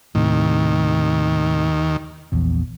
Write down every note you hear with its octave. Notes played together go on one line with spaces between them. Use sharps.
D#2 A2 C3 D#3
A#1 E2